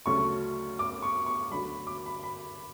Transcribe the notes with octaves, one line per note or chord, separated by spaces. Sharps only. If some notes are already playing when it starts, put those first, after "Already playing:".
D2 C#3 F#3 A3 C#6
D6
C#6
C#6
D2 D3 F#3 B5
D6
B5
B5